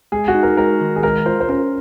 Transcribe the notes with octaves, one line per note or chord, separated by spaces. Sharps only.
G#3 G#4
F#4
D#4
A#4
G#3 A#4
D#3
G#4
G#3 A#4
F4 C5
C5
C#4 A#4